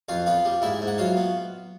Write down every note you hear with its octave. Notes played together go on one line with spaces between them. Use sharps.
F2 F4 F5
B3 F4 F5
G3
G#2 E4 E5
G#2
F#5
F#3 F4 F5
B3